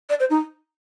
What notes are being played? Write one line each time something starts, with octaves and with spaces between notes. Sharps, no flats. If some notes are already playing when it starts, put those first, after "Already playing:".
D5
C5
D#4